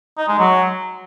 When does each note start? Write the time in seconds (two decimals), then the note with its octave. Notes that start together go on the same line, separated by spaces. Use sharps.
0.18 D#4
0.28 G#3
0.39 F#3